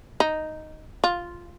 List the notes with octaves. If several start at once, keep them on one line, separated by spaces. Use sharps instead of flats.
D#4
F4